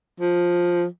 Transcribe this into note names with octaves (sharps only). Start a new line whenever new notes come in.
F3